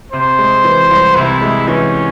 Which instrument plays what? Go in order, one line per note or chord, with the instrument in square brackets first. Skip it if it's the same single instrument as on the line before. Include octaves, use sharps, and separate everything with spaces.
[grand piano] C3 [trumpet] C5
[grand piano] G#3
E3
C2
[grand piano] C3 [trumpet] E4
[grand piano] G#3
[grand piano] E3 [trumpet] C#4